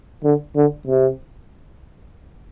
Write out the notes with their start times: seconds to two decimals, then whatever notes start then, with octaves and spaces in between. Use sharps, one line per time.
0.24 D3
0.56 D3
0.88 C3